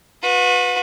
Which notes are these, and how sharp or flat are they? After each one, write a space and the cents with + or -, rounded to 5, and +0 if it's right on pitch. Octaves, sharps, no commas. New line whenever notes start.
F#4 -40 B4 +0